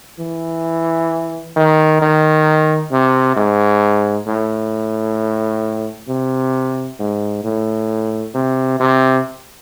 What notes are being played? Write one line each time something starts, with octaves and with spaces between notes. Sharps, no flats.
E3
D#3
D#3
C3
G#2
A2
C3
G#2
A2
C3
C3